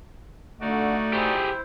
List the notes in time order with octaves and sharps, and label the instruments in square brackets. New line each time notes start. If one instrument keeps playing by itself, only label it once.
[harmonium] D3 [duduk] A3 [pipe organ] D#4 F#4 D5
[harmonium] E4 C5 [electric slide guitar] G4 G#4